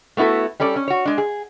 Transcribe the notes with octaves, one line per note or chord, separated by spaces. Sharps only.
A3 B3 E4 F#4 A4
G3 C#4 A4 D5
C#4
F#4 C#5
G#3 D4
G#4